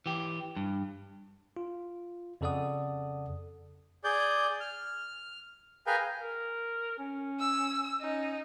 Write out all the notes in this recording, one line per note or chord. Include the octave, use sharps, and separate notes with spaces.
E3 G4
G2
F4
F2 C#3 A4 D5 F#5 D#6
G#4 D5 G6
F6
G#4 A#4 B4 F5 G5 G#5
A#4
C#4
E6
C#4 D#4